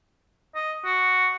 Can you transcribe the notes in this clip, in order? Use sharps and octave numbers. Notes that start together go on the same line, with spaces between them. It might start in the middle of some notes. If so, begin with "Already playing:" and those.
D#5
F#4